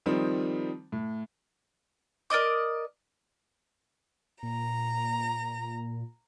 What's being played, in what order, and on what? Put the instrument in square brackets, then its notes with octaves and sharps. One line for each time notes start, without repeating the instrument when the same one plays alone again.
[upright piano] D#3 F3 G3 C4 D#4
A2
[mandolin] A#4 D5 D#5 D6
[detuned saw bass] A#2 [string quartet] A#5